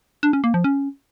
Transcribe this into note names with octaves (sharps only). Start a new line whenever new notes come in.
D4
C#4
A#3
F3
C#4